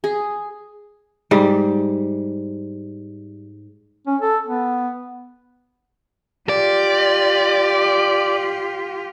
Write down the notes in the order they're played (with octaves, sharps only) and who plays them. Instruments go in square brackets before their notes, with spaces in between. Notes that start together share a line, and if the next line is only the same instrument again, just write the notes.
[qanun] G#4
[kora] G#2 G3
[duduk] C#4
A4
B3
[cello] F4 G4 [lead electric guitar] D5